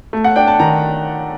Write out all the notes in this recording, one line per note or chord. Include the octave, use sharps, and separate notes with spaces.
A3
F#5
D4 G5
A5
D#3 A#5